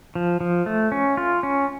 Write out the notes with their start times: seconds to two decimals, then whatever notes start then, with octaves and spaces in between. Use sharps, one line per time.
0.15 F3
0.41 F3
0.66 A3
0.92 C#4
1.17 F4
1.43 C#4